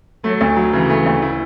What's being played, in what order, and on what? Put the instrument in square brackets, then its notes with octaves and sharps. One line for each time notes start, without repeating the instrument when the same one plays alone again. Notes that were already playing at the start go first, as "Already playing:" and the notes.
[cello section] F#3 [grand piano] A3
[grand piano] D2
F#3
[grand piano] C#3 [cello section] E3
[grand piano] A3
D2
E4